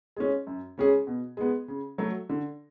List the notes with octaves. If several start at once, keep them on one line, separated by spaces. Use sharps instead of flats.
G#3 C#4
F#2
C#3 G#3 C#4 G#4
B2
G#3 B3
C#3
F#3 A3
D3